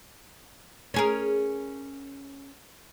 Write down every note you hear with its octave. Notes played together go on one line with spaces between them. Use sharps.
C#4 G#4 A#4